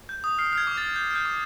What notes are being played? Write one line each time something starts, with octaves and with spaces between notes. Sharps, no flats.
G6
D#6
F6 C7
F6 G#6
D6
A6
F6
F6 G6
F6
G6
D6